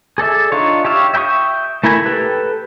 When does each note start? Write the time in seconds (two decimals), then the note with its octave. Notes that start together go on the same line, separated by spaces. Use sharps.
0.18 G#4 A4 D5 E5
0.52 D4 D#4 F4 C#5
0.85 G4 C#5 E5 F5
1.14 E5 G5 B5 C#6 D#6
1.84 A3 E4 A#4 G#5 B5
2.06 G4 A4 B4